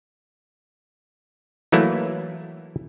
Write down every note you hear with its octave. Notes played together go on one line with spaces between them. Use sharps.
E3 F#3 A3 A#3 E4